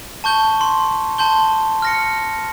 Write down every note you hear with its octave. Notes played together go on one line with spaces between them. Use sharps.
A5 C#6 G6 G7
C6
A5 C6 G6 G7
F6 A#6 C#7